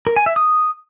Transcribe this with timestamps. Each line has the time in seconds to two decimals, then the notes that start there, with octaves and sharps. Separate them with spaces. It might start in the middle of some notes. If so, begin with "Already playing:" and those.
0.07 A#4
0.16 G#5
0.26 E5
0.36 D#6